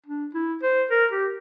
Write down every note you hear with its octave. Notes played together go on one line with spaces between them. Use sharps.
D4
E4
C5
A#4
G4